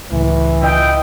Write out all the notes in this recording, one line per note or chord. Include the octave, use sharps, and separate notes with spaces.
C#2 A2 E3
E4 F4 D#5 G5